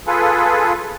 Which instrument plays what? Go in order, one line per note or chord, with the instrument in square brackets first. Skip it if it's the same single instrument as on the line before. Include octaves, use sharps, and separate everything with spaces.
[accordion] F4 G#4 A4 B4